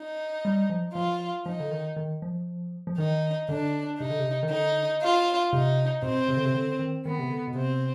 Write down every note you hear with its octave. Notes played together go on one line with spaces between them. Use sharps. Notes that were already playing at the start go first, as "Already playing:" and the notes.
Already playing: D#4
G3
F3
F3 F4
F3 D#4
D3
D#3
D#3
F3
F3
D#3 D#4
D3 D4
C3 D#4
D3
C3
D#3
D3 D#4
F4
C3 D#4
B2 C4
C3
D3
C3
D3
D#3
D#3 B3
C3
D3
B2
C3 C4